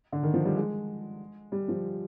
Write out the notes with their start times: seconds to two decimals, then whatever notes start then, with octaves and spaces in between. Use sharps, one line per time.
0.12 D3
0.23 D#3
0.34 F3
0.45 G3
0.56 G#3
1.52 G3
1.68 F3